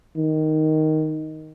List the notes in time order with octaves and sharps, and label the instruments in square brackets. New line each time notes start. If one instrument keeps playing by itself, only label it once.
[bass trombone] D#3